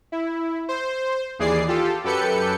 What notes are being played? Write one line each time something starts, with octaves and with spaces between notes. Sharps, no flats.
E4
C5
D#2 E3 G#4 D5 C7
F4 G4 A4
F#2 G4 A4 B4 G6 C#7